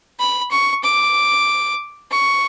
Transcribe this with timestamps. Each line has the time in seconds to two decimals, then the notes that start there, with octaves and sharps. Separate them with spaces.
0.19 B5
0.51 C#6
0.83 D6
2.11 C#6